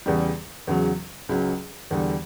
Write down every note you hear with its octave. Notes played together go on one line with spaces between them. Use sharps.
E2 C#3 G3
E2 C#3 F#3
C#2 C#3 F#3 C#4
E2 D3 G3